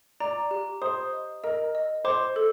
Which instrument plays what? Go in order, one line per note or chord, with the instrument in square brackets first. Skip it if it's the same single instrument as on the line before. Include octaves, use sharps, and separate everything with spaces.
[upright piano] D5 [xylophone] A#5
[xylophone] G4
[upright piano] C5 [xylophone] D#6
[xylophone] D#5
[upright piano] A#4 [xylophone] D#5
[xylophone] D#5
[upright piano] C5 [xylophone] D6
[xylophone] A4